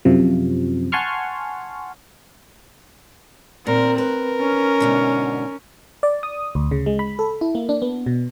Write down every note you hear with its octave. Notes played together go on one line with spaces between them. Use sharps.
F#2 C3 F3
F#5 G#5 A5 C6 C#6 F6
A#2 C4 A#4
A#4 B4
C#4
G#2 B2 D3
D5
D#6
D2
C#3
G#3
B5
A4
E4
A#3
D4
B3
B2